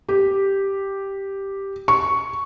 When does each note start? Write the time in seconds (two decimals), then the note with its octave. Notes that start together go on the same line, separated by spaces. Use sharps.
0.09 G4
1.88 C#6